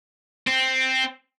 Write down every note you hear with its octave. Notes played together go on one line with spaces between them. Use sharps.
C4